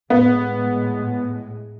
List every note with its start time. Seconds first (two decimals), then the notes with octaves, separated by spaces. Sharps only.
0.10 A2 G#3 B3